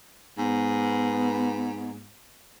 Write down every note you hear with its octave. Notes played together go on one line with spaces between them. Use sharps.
G#2 B3